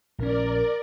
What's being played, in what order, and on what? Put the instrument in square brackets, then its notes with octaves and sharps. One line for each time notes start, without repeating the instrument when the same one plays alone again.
[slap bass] A#1 C#4 [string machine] A#4 D5